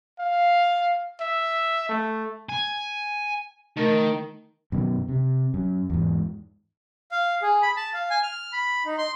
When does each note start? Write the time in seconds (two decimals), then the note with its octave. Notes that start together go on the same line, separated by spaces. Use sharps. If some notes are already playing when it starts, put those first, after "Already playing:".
0.19 F5
1.20 E5
1.89 A3
2.49 G#5
3.77 D#3 A3 A#4
4.72 F#2 B2 D#3
5.09 C3
5.54 F#2
5.90 E2 G#2
7.11 F5
7.42 G#4
7.62 B5
7.77 A5
7.94 F5
8.10 G#5
8.23 F6
8.53 B5
8.85 D#4
8.98 C6